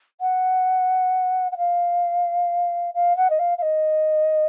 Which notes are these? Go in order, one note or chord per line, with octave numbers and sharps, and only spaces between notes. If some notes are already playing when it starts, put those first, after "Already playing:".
F#5
F#5
F5
F5
F#5
D#5
F5
F5
D#5